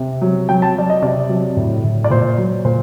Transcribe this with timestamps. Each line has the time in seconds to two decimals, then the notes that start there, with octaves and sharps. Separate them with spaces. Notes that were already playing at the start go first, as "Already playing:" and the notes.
Already playing: C3
0.22 F#3
0.49 F#3 G5
0.62 A5
0.76 F#3 D5
0.90 D#5
1.02 C3 D5
1.29 F#3
1.57 A2
1.84 A2
2.04 D5
2.10 A#2 C5
2.38 F#3
2.65 A#2 C5